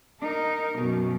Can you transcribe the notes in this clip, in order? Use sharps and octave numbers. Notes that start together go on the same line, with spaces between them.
D#4 A#4
F#2 B2